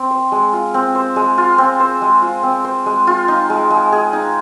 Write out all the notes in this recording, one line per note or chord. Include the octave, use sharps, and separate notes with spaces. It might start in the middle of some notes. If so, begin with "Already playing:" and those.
Already playing: C4
C5
G#3
F4
C4
C5
G#3
F4
C4
C5
G#3
F4
C4
C5
G#3
F4
D#4
G#3
G#3
G#4
D#4